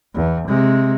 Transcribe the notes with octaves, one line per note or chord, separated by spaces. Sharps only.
E2
C3 G#3